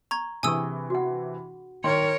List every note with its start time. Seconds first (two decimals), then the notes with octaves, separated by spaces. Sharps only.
0.11 A#5 C#6 G#6
0.43 C3 E3 D4 G#4 G#5 C#6 D#6 E6
0.90 F#4 F#5
1.84 D#3 A#4 C#5 C6